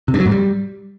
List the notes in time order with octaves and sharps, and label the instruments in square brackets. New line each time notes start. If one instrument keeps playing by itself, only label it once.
[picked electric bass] C3
G2
F#3
G#2
G3